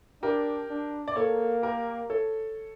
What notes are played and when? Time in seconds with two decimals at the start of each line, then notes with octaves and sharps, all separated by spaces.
0.23 D4 G4 A#4
0.70 D4
1.08 D5
1.16 A#3 A4 C#5
1.63 G4 A#4
2.10 A4 C#5